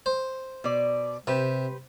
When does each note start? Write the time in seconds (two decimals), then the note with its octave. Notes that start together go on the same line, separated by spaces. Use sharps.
0.06 C5
0.64 B2 D5
1.27 C3 G4 B4 C5